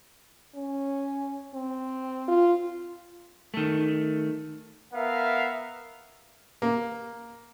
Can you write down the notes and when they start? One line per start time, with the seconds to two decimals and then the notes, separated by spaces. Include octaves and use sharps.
0.55 C#4
1.54 C4
2.28 F4
3.54 D#3 A3
4.94 B3 A#4 E5 F5
6.62 A#3